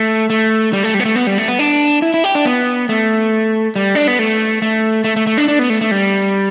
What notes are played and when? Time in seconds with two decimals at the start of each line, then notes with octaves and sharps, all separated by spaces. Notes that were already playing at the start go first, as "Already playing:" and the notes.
Already playing: A3
0.30 A3
0.73 G3
0.84 A3
0.94 G3
1.00 B3
1.05 A3
1.16 B3
1.27 G3
1.38 A3
1.48 B3
1.59 D4
2.02 E4
2.14 E4
2.24 G4
2.35 D4
2.45 B3
2.89 A3
3.76 G3
3.95 D4
4.08 B3
4.19 A3
4.62 A3
5.04 A3
5.16 A3
5.27 A3
5.37 D4
5.48 D4
5.59 B3
5.70 A3
5.81 A3
5.91 G3